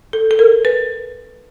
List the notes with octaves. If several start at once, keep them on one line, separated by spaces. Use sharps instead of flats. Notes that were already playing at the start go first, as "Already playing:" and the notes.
A4
A4
A#4
B4